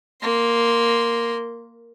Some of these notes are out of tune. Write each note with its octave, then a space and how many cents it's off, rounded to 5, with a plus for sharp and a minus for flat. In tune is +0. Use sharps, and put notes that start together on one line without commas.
A#3 +0 C6 +0